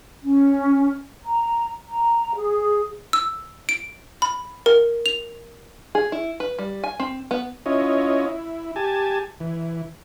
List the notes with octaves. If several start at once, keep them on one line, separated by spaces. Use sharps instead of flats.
C#4
A#5
A#5
G#4
E6
D7
B5
A#4
F7
G#4
E4
B4
G3
G#5
C4
B3
C#4 E4 F4 C#5 D#5
E4
G4 G#5 A5
E3